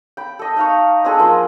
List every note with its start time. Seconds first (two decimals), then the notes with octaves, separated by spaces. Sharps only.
0.17 G5 B5
0.39 A4 D#5
0.57 D#4 F5 C#6
1.05 C4 D4 G#4 A4
1.19 F3 A#3